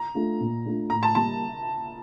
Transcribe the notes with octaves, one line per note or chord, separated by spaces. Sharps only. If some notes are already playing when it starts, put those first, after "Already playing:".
Already playing: A#5
A3 D4 F4
A#2
A3 D4 F4
A2 A#5
A5
G3 A#3 A5